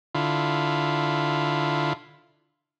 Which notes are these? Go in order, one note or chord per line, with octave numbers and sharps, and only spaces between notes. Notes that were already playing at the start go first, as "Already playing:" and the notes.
D3 E4 F4